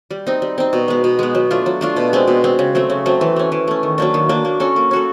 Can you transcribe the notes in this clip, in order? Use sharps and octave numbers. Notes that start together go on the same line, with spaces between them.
G3
C4 D#4
G3
C4 D#4
B2
G#3 B3
B2
G#3 B3
F#3
A3 D4 F4
F#3
A3 D4 F4
B2
G#3 C4
B2
G#3 C4
C#3
F#3 A3 C4
C#3
F#3 A3 C4
E3
A3 C#4
E3
A3 C#4
D#3
F#3 A#3 D4
D#3
F#3 A#3 D4
A#3
C#4 F#4 A4
A#3
C#4 F#4 A4